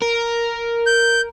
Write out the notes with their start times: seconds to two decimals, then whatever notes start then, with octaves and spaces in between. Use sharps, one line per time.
0.02 A#4
0.86 G6